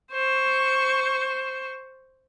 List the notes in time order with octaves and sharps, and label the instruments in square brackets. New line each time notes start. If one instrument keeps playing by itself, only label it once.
[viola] C5 C#6